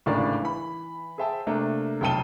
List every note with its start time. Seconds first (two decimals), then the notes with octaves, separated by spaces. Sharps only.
0.06 G#1 A2 C#3 D4 A#4 D5
0.42 E3 B5
1.18 G#4 C5 E5 G5 A5
1.47 C3 A3 A#3 D4
2.01 F1 B1 G5 A5 D#7 G7